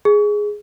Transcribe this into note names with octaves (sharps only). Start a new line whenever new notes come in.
G#4